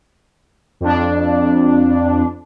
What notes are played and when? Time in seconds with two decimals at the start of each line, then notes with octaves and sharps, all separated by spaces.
0.80 F2 D4